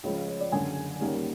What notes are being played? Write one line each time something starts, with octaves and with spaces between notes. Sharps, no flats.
C#2 C#3 F3 C#5
C#5
C#5
D5
F#1 F#2 D3 G#5
D#2 D#3 G3 A#3 C#4